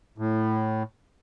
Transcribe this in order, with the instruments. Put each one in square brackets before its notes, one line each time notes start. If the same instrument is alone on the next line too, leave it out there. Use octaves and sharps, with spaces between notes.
[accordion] A2